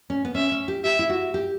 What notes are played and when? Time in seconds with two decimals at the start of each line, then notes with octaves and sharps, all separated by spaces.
0.10 C#4
0.25 B3
0.35 C#4 E5
0.52 C#4
0.68 G4
0.84 G4 E5
0.99 E4
1.10 F#4
1.34 G4